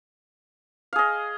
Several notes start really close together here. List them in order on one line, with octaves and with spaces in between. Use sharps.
F5 G#4 D#5